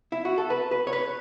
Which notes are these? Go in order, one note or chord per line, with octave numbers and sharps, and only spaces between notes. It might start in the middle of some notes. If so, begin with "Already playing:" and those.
E4
F#4
A4
B4
B4
C#5
B4